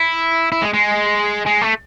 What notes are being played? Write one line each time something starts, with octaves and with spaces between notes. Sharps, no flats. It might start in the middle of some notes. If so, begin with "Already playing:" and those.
Already playing: E4
E4
G#3
G#3
G#3
A3